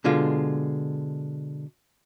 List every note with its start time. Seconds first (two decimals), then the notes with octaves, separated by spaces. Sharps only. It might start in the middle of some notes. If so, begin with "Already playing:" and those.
0.04 B2 D3 G#3 F4